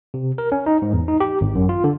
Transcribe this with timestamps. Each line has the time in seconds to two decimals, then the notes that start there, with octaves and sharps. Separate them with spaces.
0.14 C3
0.38 A#4
0.52 C#4
0.66 D#4
0.82 G#2
0.93 E2
1.08 D#4
1.20 G4
1.41 G#1
1.55 F#2
1.69 F4
1.84 D3